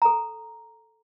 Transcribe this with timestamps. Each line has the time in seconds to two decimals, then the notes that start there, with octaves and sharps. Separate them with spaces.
0.02 A4 A#5